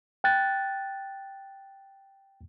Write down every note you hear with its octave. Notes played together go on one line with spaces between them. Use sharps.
G5 F#6 A6